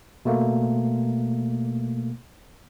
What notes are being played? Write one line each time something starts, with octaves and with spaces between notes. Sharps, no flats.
B2 A3 A#3